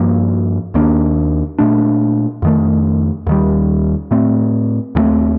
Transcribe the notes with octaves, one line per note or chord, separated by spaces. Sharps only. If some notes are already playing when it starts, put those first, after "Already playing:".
Already playing: G2 F3 A#3
D#2 D#3 A#3 D4
A#2 A3 D4
F2 D#3 A3
D#2 D#3 G3
A2 A3 C4
D#2 D#3 A3 C4